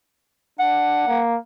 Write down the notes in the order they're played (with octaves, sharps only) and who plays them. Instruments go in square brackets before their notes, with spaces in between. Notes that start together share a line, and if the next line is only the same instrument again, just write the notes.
[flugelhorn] D4 [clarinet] F#5
[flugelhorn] A#3